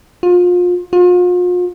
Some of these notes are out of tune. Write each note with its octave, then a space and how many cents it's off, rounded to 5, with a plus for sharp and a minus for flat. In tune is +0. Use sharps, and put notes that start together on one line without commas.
F4 +30
F4 +40